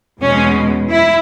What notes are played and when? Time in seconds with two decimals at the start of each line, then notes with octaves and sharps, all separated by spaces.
0.21 E2 B2 G#3 C#4
0.91 E4